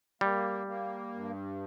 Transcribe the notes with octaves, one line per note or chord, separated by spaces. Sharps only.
G3 A#3
A#3
G2